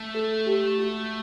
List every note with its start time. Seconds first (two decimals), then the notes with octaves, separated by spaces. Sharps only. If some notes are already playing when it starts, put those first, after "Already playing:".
Already playing: A3
0.15 A4
0.46 G4
0.78 F#4